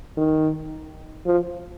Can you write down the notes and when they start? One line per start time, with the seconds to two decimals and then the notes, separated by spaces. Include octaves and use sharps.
0.17 D#3
1.26 F3